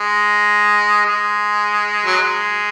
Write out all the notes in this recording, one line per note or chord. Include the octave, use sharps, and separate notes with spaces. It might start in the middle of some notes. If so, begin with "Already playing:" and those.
Already playing: G#3
G#3
F#3
G#3